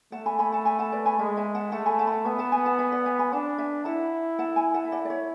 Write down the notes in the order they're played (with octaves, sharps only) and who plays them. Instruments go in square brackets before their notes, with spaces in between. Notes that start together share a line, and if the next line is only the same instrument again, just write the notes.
[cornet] A3 [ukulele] F#5 A5
[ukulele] G#5 B5
G#5 B5
F#5 A5
G#5 B5
F#5 A5
B4 D5
G#5 B5
[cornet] G#3 [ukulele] E5 G#5
[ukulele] E5 G#5
F#5 A5
[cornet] A3 [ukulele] F#5 A5
[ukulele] G#5 B5
F#5 A5
B5
F#5 A5
[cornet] B3 [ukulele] E5 G#5
[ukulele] F#5 A5
G#5 B5
F#5 A5
E5 G#5
D5 F#5
E5 G#5
G#5 B5
[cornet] D4 [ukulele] F#5 A5
[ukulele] E5 G#5
[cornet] E4 [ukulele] F#5 A5
[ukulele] F#5 A5
G#5 B5
F#5 A5
E5
D5 F#5
D5
C#5 E5